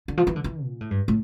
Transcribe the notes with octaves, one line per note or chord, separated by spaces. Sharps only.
D3
F3
E3
D3
E3
A#2
A2
G2
A2